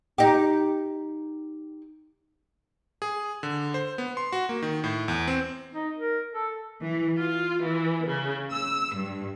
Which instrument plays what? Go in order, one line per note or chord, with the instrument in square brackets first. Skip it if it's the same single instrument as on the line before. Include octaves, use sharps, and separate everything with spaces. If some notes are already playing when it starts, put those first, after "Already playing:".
[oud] D#4 G4
[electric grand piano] G#4
D3
C5
B3
C6
F#4
A#3
D#3
A2
E2
C4
[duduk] D#4
A#4
A4
[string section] E3
F4
E3
C#3
E6
G2